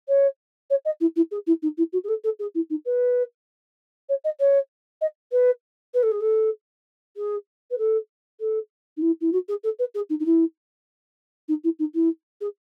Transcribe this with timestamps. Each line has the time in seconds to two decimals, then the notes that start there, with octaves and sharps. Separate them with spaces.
0.08 C#5
0.70 C#5
0.85 D#5
1.00 E4
1.16 E4
1.31 G#4
1.47 E4
1.62 D#4
1.78 E4
1.93 F#4
2.04 G#4
2.08 A4
2.24 A4
2.39 G#4
2.55 E4
2.70 D#4
2.85 B4
4.09 C#5
4.24 D#5
4.40 C#5
5.01 D#5
5.32 B4
5.94 B4
6.03 A4
6.11 G#4
6.21 A4
7.17 G#4
7.71 B4
7.78 A4
8.40 A4
8.97 D#4
9.02 E4
9.21 E4
9.32 F#4
9.48 G#4
9.63 A4
9.79 B4
9.95 G#4
10.10 D#4
10.20 D#4
10.25 E4
11.48 D#4
11.64 E4
11.79 D#4
11.94 E4
12.41 G#4